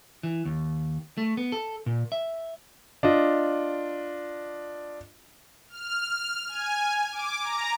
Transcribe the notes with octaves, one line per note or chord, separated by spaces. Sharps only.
E3
D#2
A3
B3
A4
A#2
E5
D4 F4 D#5
F6
G#5
D6
A#5